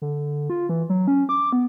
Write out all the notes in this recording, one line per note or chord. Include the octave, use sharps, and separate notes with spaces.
D3
F4
E3
F#3
C#4
D6
B3